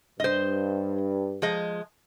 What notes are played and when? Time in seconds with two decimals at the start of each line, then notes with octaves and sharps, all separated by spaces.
0.20 G2 C5 D#5
1.42 F3 G#3 D#5